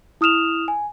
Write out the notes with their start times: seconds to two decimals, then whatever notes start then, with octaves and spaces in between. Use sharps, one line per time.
0.21 E4 D#6 F6 E7 F7
0.68 G#5